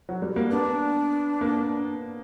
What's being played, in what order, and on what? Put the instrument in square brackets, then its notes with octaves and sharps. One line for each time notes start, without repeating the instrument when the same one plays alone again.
[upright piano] F#3
G3
A#3
[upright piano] B3 [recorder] D4
[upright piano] A#3